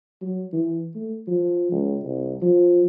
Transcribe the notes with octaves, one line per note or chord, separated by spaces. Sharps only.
F#3
E3
A3
F3
C#2
C2
F3